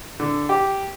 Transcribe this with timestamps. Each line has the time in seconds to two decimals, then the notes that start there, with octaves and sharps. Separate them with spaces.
0.20 D3
0.49 G4